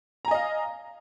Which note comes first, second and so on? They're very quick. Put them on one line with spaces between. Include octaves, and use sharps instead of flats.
A#5 G#5 D#5 F5